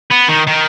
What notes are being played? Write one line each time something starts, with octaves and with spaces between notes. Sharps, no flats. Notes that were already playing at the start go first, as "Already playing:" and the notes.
B3
D#3
D#3